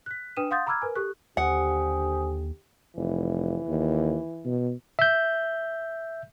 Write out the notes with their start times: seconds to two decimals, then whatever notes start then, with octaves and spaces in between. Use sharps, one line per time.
0.06 F#6 B6
0.36 D4 B4 G5 D#6 D#7 E7
0.51 F5 F#5 C6 D#6 G6 A6
0.67 A#5 B5 D6 E6 F6 G#6
0.82 A#4 B4 G#5
0.95 G4 A4 C#6 F#6
1.37 D#2 D3 G4 C5 F#5 G#5 D#6
2.97 F1 E3
3.68 D#2
4.45 B2
4.99 E5 G6